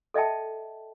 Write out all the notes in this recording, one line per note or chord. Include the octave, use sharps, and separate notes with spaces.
A4 D#5 E5 G5 A5